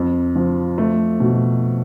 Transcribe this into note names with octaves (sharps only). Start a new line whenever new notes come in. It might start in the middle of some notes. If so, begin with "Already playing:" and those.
Already playing: F2
F3
A3
B2